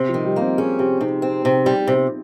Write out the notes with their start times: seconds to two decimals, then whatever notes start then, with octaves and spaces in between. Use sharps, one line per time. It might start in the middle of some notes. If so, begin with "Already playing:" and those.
Already playing: C3 C4
0.09 F3
0.14 D#3
0.25 G3
0.36 A#3 C4
0.58 C#4 G#4
0.79 C3 G4
1.01 C3 D#4
1.22 C4
1.45 C3
1.66 G3
1.88 C3